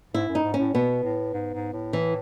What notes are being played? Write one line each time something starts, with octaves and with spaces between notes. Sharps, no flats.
G#2 E4
F#2
D#4
G#2
C#4
A2
B2 B3
A2
G#2
G#2
A2
E3